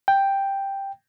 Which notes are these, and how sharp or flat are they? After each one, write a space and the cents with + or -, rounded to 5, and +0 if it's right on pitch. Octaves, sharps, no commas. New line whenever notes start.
G5 +5